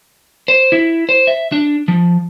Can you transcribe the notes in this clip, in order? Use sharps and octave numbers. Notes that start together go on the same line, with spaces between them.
C5
E4
C5
E5
D4
F3